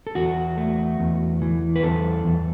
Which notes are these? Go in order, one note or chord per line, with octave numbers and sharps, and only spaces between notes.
A4
E2 F#4
A3
E2
E3
B4
E2 A4
E2